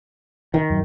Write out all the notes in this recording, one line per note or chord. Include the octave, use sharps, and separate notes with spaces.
D#3
F#2